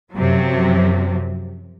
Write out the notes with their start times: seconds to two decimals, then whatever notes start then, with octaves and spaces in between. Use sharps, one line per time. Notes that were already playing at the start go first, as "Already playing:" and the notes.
0.14 F#2 C3 F3 F#3